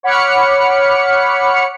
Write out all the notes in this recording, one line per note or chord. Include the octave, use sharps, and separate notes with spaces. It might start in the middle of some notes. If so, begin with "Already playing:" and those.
C#5 F#5 B5 D6 F6 C#7